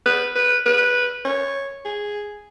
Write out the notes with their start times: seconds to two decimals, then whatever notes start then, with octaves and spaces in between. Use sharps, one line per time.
0.06 B4
0.35 B4
0.66 B4
1.25 C#5
1.85 G#4